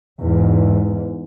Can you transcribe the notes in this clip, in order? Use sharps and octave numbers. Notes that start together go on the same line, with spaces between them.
E2 G#2